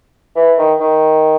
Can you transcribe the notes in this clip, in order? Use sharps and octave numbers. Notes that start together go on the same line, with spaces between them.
E3
D#3
D#3